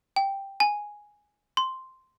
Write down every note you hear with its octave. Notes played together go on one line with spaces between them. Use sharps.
G5
G#5
C6